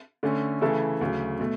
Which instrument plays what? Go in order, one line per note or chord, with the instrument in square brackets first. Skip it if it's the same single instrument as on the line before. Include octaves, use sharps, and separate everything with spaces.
[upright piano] D3 A3 C#4
C#3 E3 A3 E4 A4
D2 C#3 F#3
B2 A3